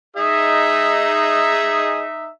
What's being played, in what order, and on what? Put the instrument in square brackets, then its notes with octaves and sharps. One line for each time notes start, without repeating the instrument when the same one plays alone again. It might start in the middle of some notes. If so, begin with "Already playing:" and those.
[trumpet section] D#4 E5 [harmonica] G#4 D#5